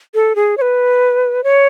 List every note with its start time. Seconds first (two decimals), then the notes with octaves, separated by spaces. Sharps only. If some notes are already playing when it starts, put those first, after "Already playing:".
0.14 A4
0.36 G#4
0.58 C#5
0.61 B4
1.44 C#5